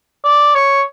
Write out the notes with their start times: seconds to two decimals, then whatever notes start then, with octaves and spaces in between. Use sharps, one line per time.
0.25 D5
0.55 C#5